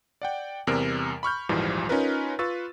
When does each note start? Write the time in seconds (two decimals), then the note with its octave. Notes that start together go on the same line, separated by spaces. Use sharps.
0.22 D5 F#5 G5
0.67 E2 C3 G3 A#4 F6 D7
1.23 B5 C#6 F6 G6
1.49 A#1 D#2 G#2 E3 F3 G3
1.89 C#4 D#4 F4 A#4 B4
2.39 F4 B4 C#6 E6 A6